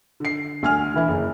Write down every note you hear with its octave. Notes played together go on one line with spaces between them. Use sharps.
D3 C7
D2 G#5 F6
D3 E3 E4
F#1